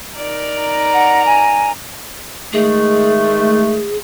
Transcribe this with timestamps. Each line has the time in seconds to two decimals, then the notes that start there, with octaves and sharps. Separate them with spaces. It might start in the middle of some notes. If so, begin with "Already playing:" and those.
0.16 D#4 A#4 D5
0.63 A#5
0.94 F#5
1.26 G#5
2.53 D#3 G#3 A3 G#4